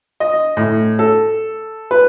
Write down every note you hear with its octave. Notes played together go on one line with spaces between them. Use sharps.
D#5
A2
A4
B4